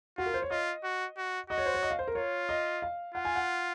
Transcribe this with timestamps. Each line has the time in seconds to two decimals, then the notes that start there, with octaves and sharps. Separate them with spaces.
0.17 F4 F#4
0.26 A#4
0.34 C5
0.42 C#5
0.51 F4 D#5
0.84 F#4
1.17 F#4
1.50 F#4 D#5
1.58 C#5
1.66 C5
1.74 C#5
1.83 D#5
1.91 F5
1.99 C5
2.08 A#4
2.15 F4 C#5
2.49 D#5
2.82 F5
3.14 F4 F#5
3.25 G#5
3.36 F#5